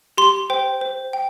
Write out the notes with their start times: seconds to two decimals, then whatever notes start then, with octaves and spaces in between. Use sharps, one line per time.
0.17 G4 C6
0.50 C5 G5
0.81 C5
1.13 G5